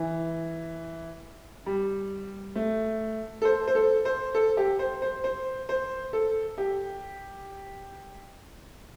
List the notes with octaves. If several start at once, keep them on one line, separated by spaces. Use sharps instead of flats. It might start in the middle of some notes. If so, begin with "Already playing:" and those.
Already playing: E3
G3
A3
A4
C5
C5
A4
C5
A4
G4
C5
C5
C5
C5
A4
G4